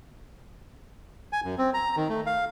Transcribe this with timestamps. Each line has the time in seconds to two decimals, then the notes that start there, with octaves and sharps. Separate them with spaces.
1.33 G#5
1.44 F#2
1.58 C4
1.74 A#5
1.96 D#3
2.09 A3
2.26 F5